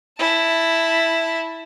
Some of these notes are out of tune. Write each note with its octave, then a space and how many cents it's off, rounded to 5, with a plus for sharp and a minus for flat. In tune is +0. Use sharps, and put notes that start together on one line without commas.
E4 +0 A5 +0